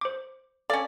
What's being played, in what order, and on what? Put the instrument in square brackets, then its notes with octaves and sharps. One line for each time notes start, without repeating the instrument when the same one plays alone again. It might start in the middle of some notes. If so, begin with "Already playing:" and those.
[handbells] C5 D6
[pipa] C#4 D5 [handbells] A4 F5